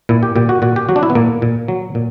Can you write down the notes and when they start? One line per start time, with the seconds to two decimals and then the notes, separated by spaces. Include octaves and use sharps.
0.09 A#2 E4
0.23 G4
0.36 A#2 G4
0.49 F#4
0.62 A#2 F#4
0.76 G4
0.89 F#3 F#4
0.96 D4
1.03 E4
1.10 B3
1.15 A#2 A#3
1.42 A#2
1.68 F#3
1.95 A#2